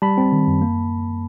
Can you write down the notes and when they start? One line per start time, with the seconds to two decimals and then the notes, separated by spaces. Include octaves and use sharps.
0.02 G3 A5 B5
0.17 C4
0.32 D#3
0.47 F#2
0.62 A#3